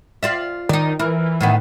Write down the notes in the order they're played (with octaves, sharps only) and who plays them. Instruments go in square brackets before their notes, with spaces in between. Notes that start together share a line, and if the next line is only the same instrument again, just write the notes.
[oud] F4 D5 E5
[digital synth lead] D#3 [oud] D#4 D5
[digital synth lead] E3 [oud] A#4
[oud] A2 D#3 B3